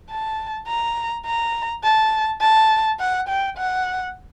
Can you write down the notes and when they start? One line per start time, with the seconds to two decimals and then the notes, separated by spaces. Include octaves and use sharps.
0.10 A5
0.68 A#5
1.26 A#5
1.84 A5
2.41 A5
3.00 F#5
3.29 G5
3.58 F#5